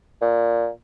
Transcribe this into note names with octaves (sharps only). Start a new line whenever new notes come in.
A#2